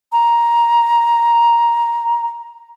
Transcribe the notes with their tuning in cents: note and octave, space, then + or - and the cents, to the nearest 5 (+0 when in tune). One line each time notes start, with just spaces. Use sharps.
A#5 +10